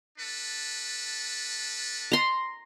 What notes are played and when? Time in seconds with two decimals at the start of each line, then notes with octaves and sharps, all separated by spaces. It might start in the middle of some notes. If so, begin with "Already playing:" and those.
0.17 D4 A4 B4
2.12 A#5 C6